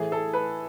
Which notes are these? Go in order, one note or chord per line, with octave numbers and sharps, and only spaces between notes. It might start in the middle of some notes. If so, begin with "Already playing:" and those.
Already playing: A2 E3 G#4
A4
B4